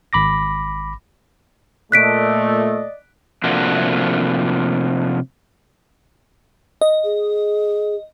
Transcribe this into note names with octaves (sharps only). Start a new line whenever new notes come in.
G#1 B5 D6 A#6
A#2 A3 D5 D#5 F#6 B6 D7
C3 F3 A3 A#3 D4 F#4
D#5
G#4